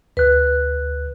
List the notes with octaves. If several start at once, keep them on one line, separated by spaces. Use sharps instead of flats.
D2 B4 F#6